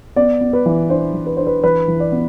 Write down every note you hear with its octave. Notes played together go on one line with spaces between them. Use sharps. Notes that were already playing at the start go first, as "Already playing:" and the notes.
B3 D5
B3
B4
E3
D4 C5
E3
B4
D4 C5
B4
E3 B4
E3
D5
B3